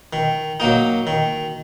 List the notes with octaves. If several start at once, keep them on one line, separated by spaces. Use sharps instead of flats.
D#3
F#3 A#3 D#4
D#3